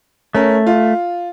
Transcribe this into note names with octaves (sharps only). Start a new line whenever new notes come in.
A3 C#4 A#4
F4